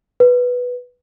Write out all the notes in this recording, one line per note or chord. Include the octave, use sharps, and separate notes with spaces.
B4